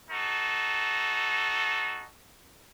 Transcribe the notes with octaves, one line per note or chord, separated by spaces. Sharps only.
D#4 F#4 A4